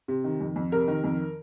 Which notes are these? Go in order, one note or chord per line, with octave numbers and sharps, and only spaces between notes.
C3
D#3
F2
F2
C3 A#4
D#3
F2